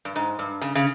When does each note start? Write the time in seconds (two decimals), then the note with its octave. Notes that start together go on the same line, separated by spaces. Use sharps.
0.05 G2
0.16 G#2
0.39 G2
0.61 C#3
0.75 C#3